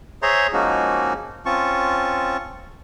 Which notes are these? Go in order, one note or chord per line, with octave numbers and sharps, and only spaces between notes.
G#4 C5 C#5 E5 A#5 C6
F3 G#3 A#3 C#4 D#4 F#4
C4 C#4 F4 A5 C#6